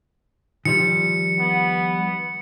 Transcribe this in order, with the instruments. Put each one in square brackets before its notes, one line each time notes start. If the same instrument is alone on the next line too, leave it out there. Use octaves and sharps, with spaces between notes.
[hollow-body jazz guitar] D#3 F3 G3 [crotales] C#7
[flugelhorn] B3